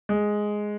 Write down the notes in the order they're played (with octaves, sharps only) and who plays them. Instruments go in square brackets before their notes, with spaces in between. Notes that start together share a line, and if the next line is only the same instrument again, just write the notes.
[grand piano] G#3